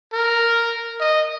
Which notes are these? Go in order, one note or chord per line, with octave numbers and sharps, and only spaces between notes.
A#4
D#5